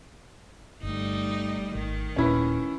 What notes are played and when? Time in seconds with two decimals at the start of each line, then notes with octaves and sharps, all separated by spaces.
0.83 G1 G3 A3 D#4
1.75 G#1 D#3
2.16 D#1 A#2 C#4 E4 B4